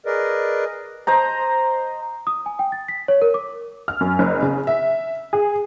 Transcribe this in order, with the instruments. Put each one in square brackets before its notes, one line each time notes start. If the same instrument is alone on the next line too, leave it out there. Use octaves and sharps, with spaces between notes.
[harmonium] G#4 A#4 B4 D5 D#5
[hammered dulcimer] C5 D#5 A#5
[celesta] D#6
G#5
G5
A6
B6
C#5
A#4
D6
[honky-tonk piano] F6
F#2
F#1
C#3
E5
G#4